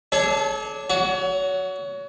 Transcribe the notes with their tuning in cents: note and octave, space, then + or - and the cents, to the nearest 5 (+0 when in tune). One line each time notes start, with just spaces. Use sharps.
D4 +0 A4 -45 C#5 +0
F#4 +0 C#5 +30